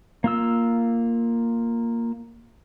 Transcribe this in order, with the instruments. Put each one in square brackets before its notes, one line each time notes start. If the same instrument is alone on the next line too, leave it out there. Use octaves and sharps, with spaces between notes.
[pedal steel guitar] A#3 F4 E6